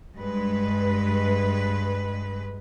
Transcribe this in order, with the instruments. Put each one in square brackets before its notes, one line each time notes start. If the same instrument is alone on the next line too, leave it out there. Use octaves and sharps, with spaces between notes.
[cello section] G2 G#3 B4